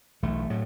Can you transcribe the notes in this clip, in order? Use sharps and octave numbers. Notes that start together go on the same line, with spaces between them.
B1 E3 A3
A2 F#3